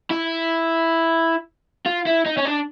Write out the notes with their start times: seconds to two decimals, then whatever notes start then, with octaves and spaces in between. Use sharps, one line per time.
0.10 E4
1.86 F4
2.07 E4
2.26 D#4
2.37 C#4
2.45 D4